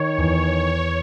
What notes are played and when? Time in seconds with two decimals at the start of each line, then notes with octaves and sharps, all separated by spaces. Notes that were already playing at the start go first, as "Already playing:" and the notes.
Already playing: D#3 C#5
0.18 E2